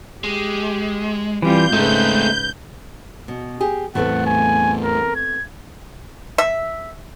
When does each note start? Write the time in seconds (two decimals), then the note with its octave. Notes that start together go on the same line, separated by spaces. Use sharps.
0.24 G#3 G4
1.42 E3 G3 C4 F4 G6
1.73 G#2 C#3 G#3 A3 C4 D#4 B4
3.28 B2
3.61 G4 G#4
3.95 E2 A2 A3 B3 C4 F#5
4.27 G#5
4.84 A#4
5.16 G#6
6.38 E5